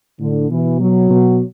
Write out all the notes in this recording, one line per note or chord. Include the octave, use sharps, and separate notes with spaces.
A2 D3
B2 E3
F#3
B2